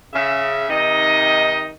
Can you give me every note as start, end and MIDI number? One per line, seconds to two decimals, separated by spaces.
0.13 0.66 49
0.13 0.66 76
0.69 1.70 48
0.69 1.70 51
0.69 1.70 63
0.69 1.70 75